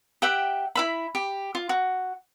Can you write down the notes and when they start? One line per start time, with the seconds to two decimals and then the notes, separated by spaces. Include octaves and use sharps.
0.22 G4 E5 F#5 G5
0.75 E4 E5 B5
1.15 G4
1.55 F4
1.69 F#4